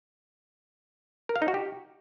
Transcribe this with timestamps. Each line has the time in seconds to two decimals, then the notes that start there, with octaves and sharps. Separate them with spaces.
1.29 A#4
1.36 F5
1.42 D#4
1.48 F#4
1.54 G4